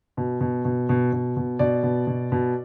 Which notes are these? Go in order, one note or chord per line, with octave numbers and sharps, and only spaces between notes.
B2
B2
B2
B2
B2
B2
B2 D5
B2
B2
B2